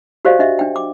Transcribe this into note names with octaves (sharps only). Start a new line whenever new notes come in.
F#4 G4 C5 D5 D#5 F5
D4 D#5 E5
D4 G5
D6